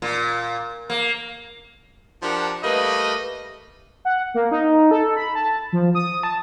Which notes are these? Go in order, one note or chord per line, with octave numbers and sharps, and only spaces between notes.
A#2
A#3
F3 D4 G4 A#4 F#5
G3 A3 A#3 B4 D#5
F#5
A#3
D#4
A4
B5
A5
F3
D#6
A5